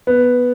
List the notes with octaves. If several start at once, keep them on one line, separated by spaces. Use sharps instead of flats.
B3